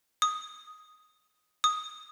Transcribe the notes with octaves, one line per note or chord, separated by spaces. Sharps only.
D#6
D#6